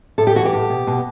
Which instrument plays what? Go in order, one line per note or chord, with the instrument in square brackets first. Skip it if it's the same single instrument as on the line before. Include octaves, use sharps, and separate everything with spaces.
[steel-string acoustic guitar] A2 A4
G4
E3 F#4
G4
A2
B2
B2